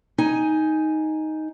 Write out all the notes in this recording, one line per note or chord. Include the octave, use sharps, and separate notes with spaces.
D#4 G#5